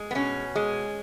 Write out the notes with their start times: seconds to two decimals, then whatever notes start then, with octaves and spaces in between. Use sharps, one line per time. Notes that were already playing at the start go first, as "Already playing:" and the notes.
Already playing: G#3
0.11 B3
0.15 B2 C#4
0.55 G#3